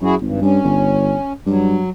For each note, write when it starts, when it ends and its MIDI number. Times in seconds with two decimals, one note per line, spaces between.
0.01 0.15 42
0.01 0.15 64
0.01 0.15 66
0.01 0.15 68
0.22 0.37 32
0.22 0.40 43
0.42 0.59 43
0.42 1.33 61
0.64 1.16 31
1.46 1.80 43
1.46 1.90 54